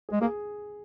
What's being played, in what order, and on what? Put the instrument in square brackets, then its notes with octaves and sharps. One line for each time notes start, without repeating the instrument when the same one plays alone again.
[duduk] G#3 [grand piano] G#4
[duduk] A#3 [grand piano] G#4